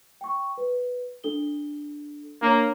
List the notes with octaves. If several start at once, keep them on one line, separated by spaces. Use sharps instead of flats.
G5 C#6
B4
D4 A4 G7
A#3 D4 C#5